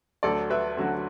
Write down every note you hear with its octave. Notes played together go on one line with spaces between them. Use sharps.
D2 D3 F#3 A4 D5
B4 E5
D2 D3 F#3